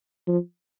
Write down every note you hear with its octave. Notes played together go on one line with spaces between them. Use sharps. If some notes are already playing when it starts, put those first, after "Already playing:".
F3